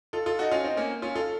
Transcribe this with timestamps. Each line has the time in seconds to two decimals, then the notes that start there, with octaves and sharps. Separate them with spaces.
0.13 F4 A4
0.26 F4 A4
0.39 D#4 F#4
0.51 C#4 F4
0.64 C4 D#4
0.77 A#3 C#4
1.02 C#4 F4
1.15 F4 A4